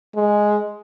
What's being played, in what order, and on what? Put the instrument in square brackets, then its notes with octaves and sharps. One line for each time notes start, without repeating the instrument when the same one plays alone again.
[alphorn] G#3